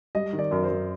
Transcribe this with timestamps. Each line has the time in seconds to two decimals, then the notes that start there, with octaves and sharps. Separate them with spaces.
0.15 G3 D#5
0.33 D#3
0.39 D5
0.51 F#2 A#4
0.63 C5
0.69 F#2